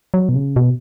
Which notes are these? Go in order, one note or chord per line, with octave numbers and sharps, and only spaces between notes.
F#3
B2
C#3
B2